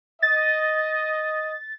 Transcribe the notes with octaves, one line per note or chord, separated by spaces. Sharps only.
D#5 A6